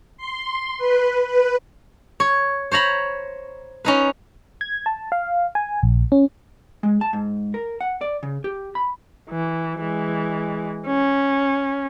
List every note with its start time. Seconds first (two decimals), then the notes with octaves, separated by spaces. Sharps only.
0.17 C6
0.78 B4
1.27 B4
2.20 C#5
2.72 C5 C#5 A#5 B5
3.85 C#4 D#4 B4
4.61 G#6
4.86 A5
5.12 F5
5.55 G#5
5.83 A#1
6.12 C#4
6.83 G#3
7.01 A5
7.13 G#2
7.54 A#4
7.81 F#5
8.01 D5
8.23 C#3
8.44 G4
8.75 B5
9.30 E3
9.81 E3 G#3
10.87 C#4